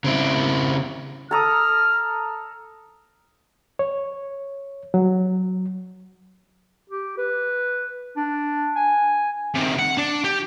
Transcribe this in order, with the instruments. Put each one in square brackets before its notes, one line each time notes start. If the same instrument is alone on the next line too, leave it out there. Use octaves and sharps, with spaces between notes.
[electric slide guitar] C#3 C4 E4
[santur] A4 A#5 D#6 [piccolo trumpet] F6
[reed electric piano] C#5
F#3
[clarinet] G4
B4
D4
G#5
[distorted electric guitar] C3 D#3
F#5
D4
G4